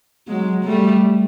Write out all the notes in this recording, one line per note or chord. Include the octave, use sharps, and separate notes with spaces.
F#3 G#3
G3 A3